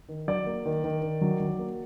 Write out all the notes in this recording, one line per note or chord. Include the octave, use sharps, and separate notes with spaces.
D#3
F#3 D5
A#3
D#3
D#3
D#3
F#3
F#3
A#3